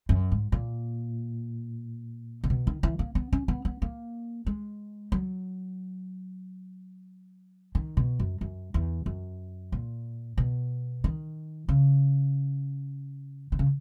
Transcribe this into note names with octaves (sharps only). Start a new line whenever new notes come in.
F#2
G#2
A#2
A#2
B2
D#3
E3
A#3
B3
C#4
B3
B3
A#3
G#3
F#3
D#3
B2
F#2
F#2
E2
F#2
A#2
B2
D#3
C#3
D#3
C#3